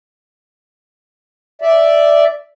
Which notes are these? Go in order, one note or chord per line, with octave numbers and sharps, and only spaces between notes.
D5 E5